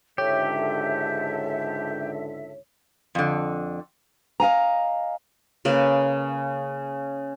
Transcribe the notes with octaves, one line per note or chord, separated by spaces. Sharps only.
C#2 G#2 D3 G4 A4 C#5 E5
F2 D3
D#5 F5 G#5 A#5
C#3 A#3 B4